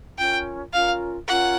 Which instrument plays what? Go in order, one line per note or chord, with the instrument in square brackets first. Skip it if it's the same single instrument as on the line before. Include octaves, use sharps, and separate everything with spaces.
[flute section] C#4 F4 A#4 [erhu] G5
[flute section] C#4 F4 A#4 [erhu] F5
[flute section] C#4 F4 A#4 [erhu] F#5